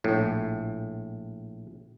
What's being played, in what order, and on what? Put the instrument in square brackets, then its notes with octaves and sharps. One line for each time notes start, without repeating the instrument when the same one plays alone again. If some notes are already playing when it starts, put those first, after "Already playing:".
[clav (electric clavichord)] A#1 A2